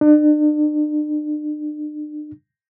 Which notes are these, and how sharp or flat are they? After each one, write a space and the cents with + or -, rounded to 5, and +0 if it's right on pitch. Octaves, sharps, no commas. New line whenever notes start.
D4 +40